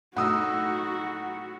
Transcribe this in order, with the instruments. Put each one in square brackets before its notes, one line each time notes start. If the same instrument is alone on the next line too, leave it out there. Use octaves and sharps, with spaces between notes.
[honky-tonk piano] A2 F#3 [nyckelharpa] D#4 [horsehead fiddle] F#4 [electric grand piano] F#5 D#6 E6